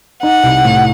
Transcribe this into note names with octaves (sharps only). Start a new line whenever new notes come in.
D#4 F#5
C2
A2